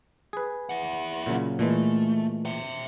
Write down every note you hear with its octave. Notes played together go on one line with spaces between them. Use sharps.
G#4 B4
E4 F#5
A#2 C#3 F#3
A#2 E3 G#3 A3
E5 G5